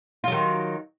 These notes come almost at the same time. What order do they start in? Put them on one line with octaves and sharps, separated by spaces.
F4 F#3 D#3